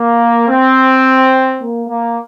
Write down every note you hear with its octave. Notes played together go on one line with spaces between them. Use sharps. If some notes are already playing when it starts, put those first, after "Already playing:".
Already playing: A#3
C4
A#3
A#3